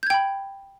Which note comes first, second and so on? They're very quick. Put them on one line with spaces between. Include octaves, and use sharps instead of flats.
G6 G#6 G5 B5